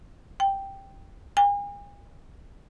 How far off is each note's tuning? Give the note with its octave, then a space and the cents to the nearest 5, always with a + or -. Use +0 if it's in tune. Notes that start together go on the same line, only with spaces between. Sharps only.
G5 +0
G#5 -40